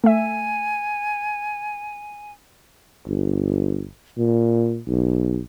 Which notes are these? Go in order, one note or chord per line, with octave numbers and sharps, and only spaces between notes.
A3 E5 G#5
G1
A#2
B1